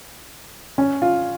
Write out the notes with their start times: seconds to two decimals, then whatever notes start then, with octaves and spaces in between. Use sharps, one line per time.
0.78 C#4
1.02 F4